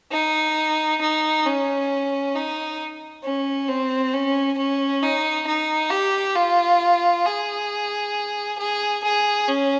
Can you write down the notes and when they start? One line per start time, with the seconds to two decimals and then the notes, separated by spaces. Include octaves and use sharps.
0.12 D#4
1.01 D#4
1.46 C#4
2.35 D#4
3.23 C#4
3.69 C4
4.13 C#4
4.58 C#4
5.03 D#4
5.47 D#4
5.91 G4
6.36 F4
7.25 G#4
8.58 G#4
9.04 G#4
9.48 C#4